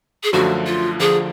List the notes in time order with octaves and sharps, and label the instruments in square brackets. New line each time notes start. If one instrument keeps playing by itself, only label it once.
[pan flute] G#4
[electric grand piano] F#2 D3 F3 A3 [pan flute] F#4
[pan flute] F4
[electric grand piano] D2 D3 F3 [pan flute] G#4